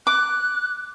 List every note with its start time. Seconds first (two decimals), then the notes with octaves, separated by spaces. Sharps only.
0.07 D6 F#6